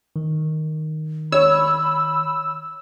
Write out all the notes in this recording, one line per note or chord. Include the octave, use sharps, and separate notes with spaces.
D#3
C#5 B5 E6